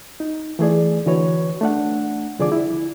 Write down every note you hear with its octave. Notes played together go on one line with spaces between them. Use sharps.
D#4
E3 A3 G#4 D5
D3 E3 F#4 B4 C#5
A3 D4 F#5
C2 D3 F3 G#4 D5 D6
E4